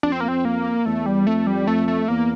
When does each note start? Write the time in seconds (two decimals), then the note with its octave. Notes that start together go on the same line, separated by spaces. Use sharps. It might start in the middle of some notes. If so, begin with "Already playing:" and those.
0.03 F2 D4
0.12 C4
0.21 A#3
0.28 C4
0.45 A#3
0.85 E2 A3
1.06 G3
1.26 F2 A3
1.47 G3
1.67 F2 A3
1.88 A3
2.08 E2 A#3